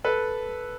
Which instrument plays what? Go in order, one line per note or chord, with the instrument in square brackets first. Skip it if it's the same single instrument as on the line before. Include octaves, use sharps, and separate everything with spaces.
[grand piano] A4 B4